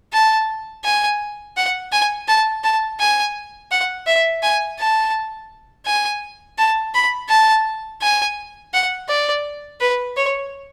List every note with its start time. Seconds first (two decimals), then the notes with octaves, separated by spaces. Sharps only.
0.13 A5
0.84 G#5
1.56 F#5
1.92 G#5
2.28 A5
2.64 A5
3.00 G#5
3.71 F#5
4.06 E5
4.43 G#5
4.79 A5
5.86 G#5
6.58 A5
6.94 B5
7.29 A5
8.02 G#5
8.73 F#5
9.09 D5
9.80 B4
10.16 C#5